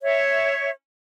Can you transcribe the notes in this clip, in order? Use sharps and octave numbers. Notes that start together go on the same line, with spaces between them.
C#5 E5